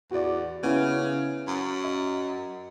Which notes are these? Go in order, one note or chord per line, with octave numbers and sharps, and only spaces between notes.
E2 F#4 D5
C#3 B3 C#4 E4
F#2
D#5